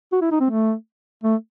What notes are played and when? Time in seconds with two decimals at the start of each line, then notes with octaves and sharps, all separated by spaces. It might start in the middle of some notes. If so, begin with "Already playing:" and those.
0.12 F#4
0.22 E4
0.31 D#4
0.40 C4
0.50 A3
1.24 A3